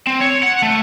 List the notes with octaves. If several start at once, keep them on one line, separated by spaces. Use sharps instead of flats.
C4
C#5
F#5
A3